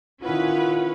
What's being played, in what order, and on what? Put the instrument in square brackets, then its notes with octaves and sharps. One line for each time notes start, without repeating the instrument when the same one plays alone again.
[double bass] D#3 E4 [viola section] C#4 B4 [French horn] F4 [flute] F#5